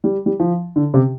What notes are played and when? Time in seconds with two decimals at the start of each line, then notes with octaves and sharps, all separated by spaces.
0.04 G3
0.26 G3
0.40 F3
0.76 D3
0.94 C3